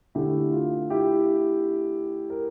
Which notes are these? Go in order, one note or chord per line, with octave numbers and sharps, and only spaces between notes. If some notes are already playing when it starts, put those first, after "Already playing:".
D3 A3 E4 G4
F4
E4 G4
A#4